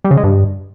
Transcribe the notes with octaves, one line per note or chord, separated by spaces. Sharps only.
G3
C#3
G#3
G2